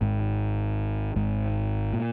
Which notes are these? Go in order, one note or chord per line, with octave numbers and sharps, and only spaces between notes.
G#1 G#2
G#1 G#2
A#2